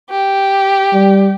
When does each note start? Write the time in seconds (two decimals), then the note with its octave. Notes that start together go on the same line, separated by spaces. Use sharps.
0.11 G4
0.93 G3